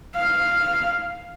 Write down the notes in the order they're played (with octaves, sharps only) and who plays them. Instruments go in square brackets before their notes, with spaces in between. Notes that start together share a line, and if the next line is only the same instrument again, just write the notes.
[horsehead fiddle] F5